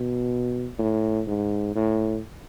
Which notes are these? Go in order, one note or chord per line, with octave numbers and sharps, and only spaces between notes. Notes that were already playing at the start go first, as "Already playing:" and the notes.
Already playing: B2
A2
G#2
A2